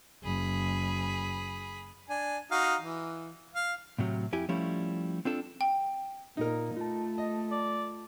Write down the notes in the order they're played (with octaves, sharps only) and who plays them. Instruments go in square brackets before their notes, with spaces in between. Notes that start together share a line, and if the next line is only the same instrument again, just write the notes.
[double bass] F#1 [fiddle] G#4 B5
[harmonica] D4 G#5
D#4 F#4 F5
E3
F5
[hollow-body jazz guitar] A2 C3 F#3
F2 E4 G4 G#5
F3 G3 A3 C#4 E4
C4 D4 F4 A4
[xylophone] G5
[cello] A#2 [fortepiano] D#4 A#4
[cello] A3 [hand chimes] F4 A5
[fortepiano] D#5
[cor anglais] D5